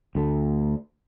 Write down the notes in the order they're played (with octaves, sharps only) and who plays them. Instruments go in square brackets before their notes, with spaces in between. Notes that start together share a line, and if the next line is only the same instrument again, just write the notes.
[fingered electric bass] D2 A3